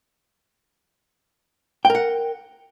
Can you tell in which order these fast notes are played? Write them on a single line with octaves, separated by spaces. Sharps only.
G5 A#4 F#5